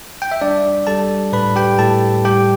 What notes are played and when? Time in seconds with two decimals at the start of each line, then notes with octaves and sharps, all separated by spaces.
0.22 G5
0.32 E5
0.41 G3 D4 D5
0.87 G3 A4 A5
1.33 A2 B4 B5
1.56 G4 G5
1.79 A2 A4 A5
2.25 G3 G4 G5